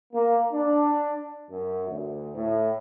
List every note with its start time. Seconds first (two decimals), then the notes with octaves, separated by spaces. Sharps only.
0.13 A#3
0.52 D4
1.51 F#2
1.89 D2
2.36 A2